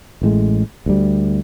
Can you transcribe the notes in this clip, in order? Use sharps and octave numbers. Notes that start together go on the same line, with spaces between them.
A1 A2 G#3
D2 G3